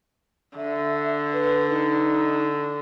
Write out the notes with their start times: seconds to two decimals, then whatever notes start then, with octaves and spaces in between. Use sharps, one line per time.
0.57 D3 E5
1.33 B4
1.70 D#4